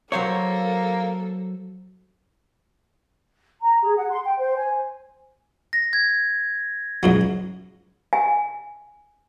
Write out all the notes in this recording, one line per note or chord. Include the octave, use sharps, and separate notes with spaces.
F#3 A#3 A4 C5 C#5
A#5
G#4
F#5
C6
G5
C5
G#5
A#6
G#6
C#2 G#2 F#3
G#5